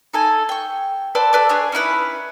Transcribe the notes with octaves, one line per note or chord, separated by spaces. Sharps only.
D#4 A4 G#5
G5 C#6
A4 B4 C5 D5
A4 B4 D5
D4 G#4 C#5
C#4 D#4 E4 B4